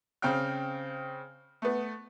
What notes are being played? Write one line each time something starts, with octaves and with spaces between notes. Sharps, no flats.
C#3 C4 G5 F6
A3 B3